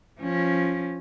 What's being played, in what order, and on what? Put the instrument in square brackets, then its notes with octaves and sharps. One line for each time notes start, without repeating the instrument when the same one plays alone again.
[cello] F3 C#4